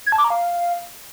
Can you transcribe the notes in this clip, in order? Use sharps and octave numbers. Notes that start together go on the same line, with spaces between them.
G#6
A5
D6
A#5
F5